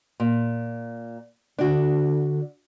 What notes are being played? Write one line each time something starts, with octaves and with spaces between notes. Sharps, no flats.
A#2
D3 D4 F#4